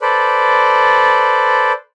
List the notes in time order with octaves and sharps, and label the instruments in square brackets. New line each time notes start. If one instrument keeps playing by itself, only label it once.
[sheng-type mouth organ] A4 B4 C5 D5